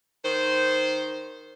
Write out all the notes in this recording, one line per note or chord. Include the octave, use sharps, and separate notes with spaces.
D#3 C5